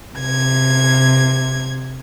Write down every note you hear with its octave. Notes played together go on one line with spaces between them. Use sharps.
C3 G#6